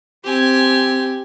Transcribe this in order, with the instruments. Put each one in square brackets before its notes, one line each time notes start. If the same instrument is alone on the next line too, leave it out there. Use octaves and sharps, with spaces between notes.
[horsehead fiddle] C4 [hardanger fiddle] G4 G#5